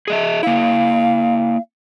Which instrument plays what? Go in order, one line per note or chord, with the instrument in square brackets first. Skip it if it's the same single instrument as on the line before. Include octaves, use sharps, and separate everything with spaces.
[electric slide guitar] G#4 D#5 E5
[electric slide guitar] A#3 E4 [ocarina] F5